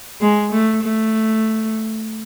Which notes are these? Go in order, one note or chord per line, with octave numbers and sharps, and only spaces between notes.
G#3
A3
A3